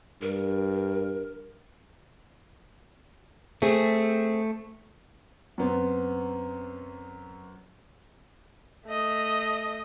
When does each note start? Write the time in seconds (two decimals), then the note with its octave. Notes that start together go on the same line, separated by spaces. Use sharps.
0.22 G2 A#4
3.62 A3 C4 G#4
5.58 F#2 B3 C4
8.86 A3 D#5